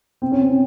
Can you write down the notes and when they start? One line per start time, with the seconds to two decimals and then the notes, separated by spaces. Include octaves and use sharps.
0.22 C4
0.32 C#4
0.41 C4
0.50 C#4